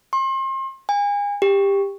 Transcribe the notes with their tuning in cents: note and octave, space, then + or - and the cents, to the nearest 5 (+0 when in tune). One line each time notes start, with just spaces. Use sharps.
C6 +35
G#5 -35
G4 +15